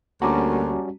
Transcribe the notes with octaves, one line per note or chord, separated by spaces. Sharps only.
D2 G3 A#3 C#4 F#4 A5 A#5 D6